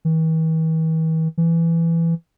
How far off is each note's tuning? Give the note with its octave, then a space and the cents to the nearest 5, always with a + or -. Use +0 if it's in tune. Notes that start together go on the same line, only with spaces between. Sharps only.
E3 -45
E3 +15